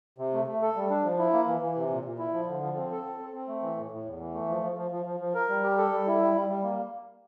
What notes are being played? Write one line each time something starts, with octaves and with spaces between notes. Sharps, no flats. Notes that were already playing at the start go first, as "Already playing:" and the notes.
C3
A3
A3
A4
G3
D4
F3
E4
A#3
E3
E3
C3
A#2
A#2
E4
F3
D3
F3
C4
A4
C4
C4
C4
A3
E3
A2
A2
E2
E3
A3
F3
F3
F3
F3
F3
F3
A#4
G3
G4
A4
G3
E4
G3
G3
G3
A#3